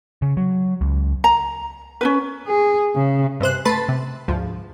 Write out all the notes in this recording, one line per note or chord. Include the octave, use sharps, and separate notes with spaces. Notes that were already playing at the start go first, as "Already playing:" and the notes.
C#3
F#3
C#2
A#5
C#4 D#4 B4
G#4
C#3
G2 C3 C5 F#6
A3 B4 A5 B5 C6 A6
C3
D2 G#2 F3